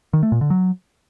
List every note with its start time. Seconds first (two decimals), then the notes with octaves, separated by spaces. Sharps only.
0.13 D#3
0.23 A3
0.32 A#2
0.41 D3
0.50 F#3